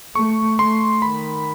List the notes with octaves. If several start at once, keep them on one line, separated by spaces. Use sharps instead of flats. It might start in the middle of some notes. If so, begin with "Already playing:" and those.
A3 C#6
A3 C6
D#3 B5